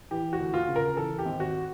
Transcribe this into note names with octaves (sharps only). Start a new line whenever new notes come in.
E3 G4
F#4
D2
F4
C#3
A#4
E3 A4
G4
G#1
F#4